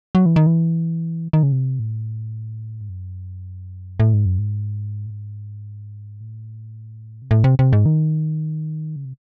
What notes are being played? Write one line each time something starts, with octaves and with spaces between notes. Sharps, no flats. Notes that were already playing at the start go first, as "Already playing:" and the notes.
F#3
E3
D#3
E3
D#3
C#3
C3
A2
G#2
F#2
A2
G#2
F#2
G#2
A2
G#2
A2
C3
A2
C3
C3
G#2
D#3
C#3
C3